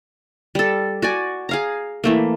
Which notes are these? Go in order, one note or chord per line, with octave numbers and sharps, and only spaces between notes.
G3 A4
F#4 D5 G#5
G#4 F5 A#5
E3 A3 A#3